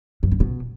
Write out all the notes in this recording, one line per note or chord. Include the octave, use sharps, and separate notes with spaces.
F#2
C#3
B2